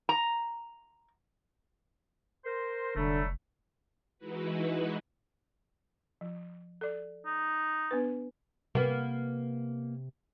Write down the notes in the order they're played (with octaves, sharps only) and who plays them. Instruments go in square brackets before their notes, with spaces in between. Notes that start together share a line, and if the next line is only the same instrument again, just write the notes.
[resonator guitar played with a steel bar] A#5
[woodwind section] A#4 C5
[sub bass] F1 [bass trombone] D3 [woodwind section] F#3 G3 A3
[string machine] E3 G#3 D#4 E4 F#4 B4
[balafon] F3
A4 D5
[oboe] D#4
[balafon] B3 D4 B4
[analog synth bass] C3 [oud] A#3 B3